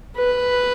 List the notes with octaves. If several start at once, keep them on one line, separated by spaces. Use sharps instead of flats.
B4